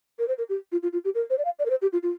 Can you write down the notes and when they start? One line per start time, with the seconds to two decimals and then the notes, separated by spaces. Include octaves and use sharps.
0.19 A#4
0.28 C5
0.38 A#4
0.49 G4
0.72 F4
0.83 F4
0.93 F4
1.05 G4
1.15 A#4
1.30 C5
1.38 D5
1.45 F5
1.59 D5
1.65 A#4
1.70 C5
1.82 G4
1.93 F4
2.03 F4